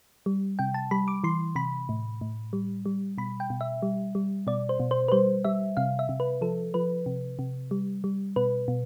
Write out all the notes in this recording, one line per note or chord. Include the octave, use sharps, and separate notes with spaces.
G3
C3 G5
A5
G3 B5
D6
E3 C6
C3 B5
A2
A2
G3
G3
B2 B5
G5
B2
E5
G3
G3
B2 D5
C5
B2
C5
B4
G3 C5
G3 E5
C3 F5
E5
C3
B4
F3 A4
F3 B4
C3
C3
G3
G3
B2 B4
B2